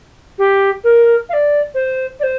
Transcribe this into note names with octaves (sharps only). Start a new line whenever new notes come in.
G4
A#4
F5
D5
C5
D5
C5